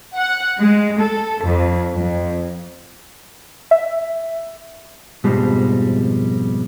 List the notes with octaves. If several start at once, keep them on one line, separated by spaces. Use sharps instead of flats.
F#5
G#3
A4
F2
F2
E5
F2 G#2 B2 F3 G3 G#3